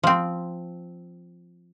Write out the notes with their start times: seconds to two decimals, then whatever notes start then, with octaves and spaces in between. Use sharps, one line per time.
0.03 F3 C4